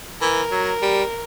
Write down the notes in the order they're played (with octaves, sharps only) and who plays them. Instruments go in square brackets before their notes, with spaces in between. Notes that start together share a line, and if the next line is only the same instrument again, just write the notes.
[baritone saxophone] E3 [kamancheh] A#4
[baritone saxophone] F#3
G3